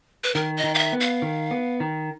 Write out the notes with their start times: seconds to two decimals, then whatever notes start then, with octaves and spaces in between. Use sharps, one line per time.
0.24 B4
0.35 D#3 A#4
0.57 D#5
0.64 D#3
0.75 F5
0.79 E5
0.93 B3
1.00 F5
1.22 D#3
1.51 B3
1.80 D#3